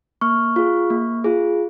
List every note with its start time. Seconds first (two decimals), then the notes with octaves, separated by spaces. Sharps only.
0.21 A#3 C#6 F6
0.56 F4 G#4
0.90 A#3
1.24 F4 G#4